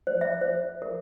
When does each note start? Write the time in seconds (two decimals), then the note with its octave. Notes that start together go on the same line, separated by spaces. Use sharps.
0.07 C5
0.21 E5
0.41 C5
0.82 A#4